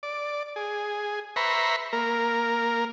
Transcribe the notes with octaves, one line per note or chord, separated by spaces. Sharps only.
D5
G#4
B4 C5 E5 A#5 B5 C#6
A#3 A#4